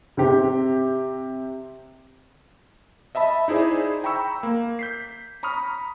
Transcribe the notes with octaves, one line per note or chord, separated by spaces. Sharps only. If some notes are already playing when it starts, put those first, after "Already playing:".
C3 C4 G4
D#5 E5 A5 B5
D#4 E4 G#4 C5 D5
G5 A#5 B5 C#6 E6
A#3
G6 B6 C7
A#5 B5 C#6 D#6 F6